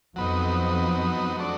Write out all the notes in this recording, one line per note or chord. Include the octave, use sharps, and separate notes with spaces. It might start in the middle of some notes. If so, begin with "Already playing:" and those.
F2 F#3 B3 D#4
F#3 A3 D4